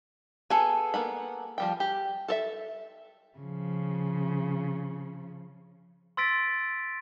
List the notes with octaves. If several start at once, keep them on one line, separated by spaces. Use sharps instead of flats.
B3 G#4 A4 G#5
A#3 B3 B5
F3 G3 G5
G4
A4 A#4 E5
C#3 F3
C6 E6 A6 B6 D7